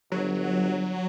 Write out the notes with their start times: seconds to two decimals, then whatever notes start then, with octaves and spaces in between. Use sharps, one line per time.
0.12 G1 F#3